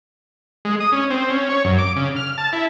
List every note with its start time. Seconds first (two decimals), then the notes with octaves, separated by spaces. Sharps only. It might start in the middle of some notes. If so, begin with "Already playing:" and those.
0.65 G#3
0.80 D#6
0.92 C#4
1.10 C4
1.30 C#4
1.49 C#5
1.65 F#2
1.78 D6
1.96 C#3
2.16 F6
2.38 A5
2.53 E4